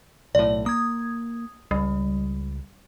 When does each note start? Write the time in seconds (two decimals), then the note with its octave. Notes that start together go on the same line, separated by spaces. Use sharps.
0.35 B1 A2 D5
0.66 A#3 D#6 G#6
1.71 C#2 G3